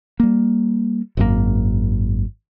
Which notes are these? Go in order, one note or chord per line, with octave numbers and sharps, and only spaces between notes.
G3 A#3
G#1 F#2 A2 A#3